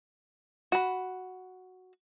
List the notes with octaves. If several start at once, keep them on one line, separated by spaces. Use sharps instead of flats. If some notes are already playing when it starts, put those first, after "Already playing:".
F#4 B5